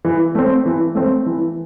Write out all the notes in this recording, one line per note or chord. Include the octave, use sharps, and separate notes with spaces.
E3
A3 C4
E3
A3 C4
E3